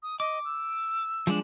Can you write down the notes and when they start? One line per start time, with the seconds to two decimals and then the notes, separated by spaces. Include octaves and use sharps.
0.03 D#6
0.20 D#5 D6
0.45 E6
1.27 F3 G#3 D4